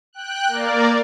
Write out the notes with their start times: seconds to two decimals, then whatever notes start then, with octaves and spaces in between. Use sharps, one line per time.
0.13 G5 F#6
0.48 A#3 A#4 D5